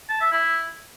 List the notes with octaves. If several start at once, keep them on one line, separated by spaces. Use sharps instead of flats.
A5
E5
E4